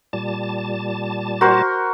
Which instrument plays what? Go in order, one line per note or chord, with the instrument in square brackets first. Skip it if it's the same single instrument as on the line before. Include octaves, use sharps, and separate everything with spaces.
[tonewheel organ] A#2 G3 A5
[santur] F#4 A#4 C5